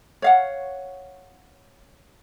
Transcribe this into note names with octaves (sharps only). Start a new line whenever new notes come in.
C#5 F5 F#5